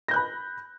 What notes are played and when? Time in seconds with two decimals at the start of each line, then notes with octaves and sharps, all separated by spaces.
0.08 A#6
0.11 G6
0.14 F#6
0.16 B5